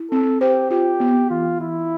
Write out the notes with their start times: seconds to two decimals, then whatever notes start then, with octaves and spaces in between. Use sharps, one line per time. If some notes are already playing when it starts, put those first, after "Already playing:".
Already playing: E4
0.11 C4 A4
0.41 G4 C5
0.70 F4 G4
1.00 B3
1.30 E3 F4
1.60 E3 E4